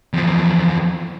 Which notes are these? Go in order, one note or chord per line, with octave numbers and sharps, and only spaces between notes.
E2 F3